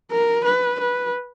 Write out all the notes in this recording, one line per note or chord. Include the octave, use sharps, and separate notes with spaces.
A#4
B4
B4